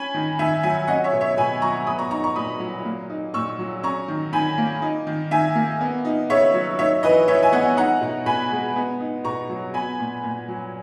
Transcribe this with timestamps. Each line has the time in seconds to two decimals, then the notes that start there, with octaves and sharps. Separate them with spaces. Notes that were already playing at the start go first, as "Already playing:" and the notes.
Already playing: C#4 G#5 B5
0.14 D#3
0.39 D#3 E5 G#5
0.63 F#3 E5 G#5
0.87 C#4 D#5 F#5
1.04 C#5 E5
1.13 B2
1.21 C#5 E5
1.37 B2 G#5 B5
1.62 F#3 A#5 C#6
1.86 B3 B5 D#6
1.99 A#5 C#6
2.11 D#4 A#5 C#6
2.24 A#5 C#6
2.36 A#2 B5 D#6
2.60 F#3
2.85 A#3
3.10 D#4
3.34 A#2 C#6 E6
3.59 F#3
3.83 C#4 A#5 C#6
4.08 D#3
4.33 D#3 G#5 B5
4.58 A#3
4.82 D#4
5.07 D#3
5.31 D#3 E5 G#5
5.55 A#3
5.80 B3
6.05 D#4
6.29 C#3 C#5 E5
6.54 F#3
6.79 D#4 C#5 E5
7.03 E3 B4 D#5
7.28 E3 C#5 E5
7.43 G#5
7.52 B3 D#5 F#5
7.77 D#4 F#5 A#5
8.01 B2
8.26 B2 G#5 B5
8.51 G#3
8.76 B3
9.00 D#4
9.24 B2 A#5 C#6
9.50 F#3
9.74 B3 G#5 B5
9.99 A#2
10.24 A#2
10.48 F#3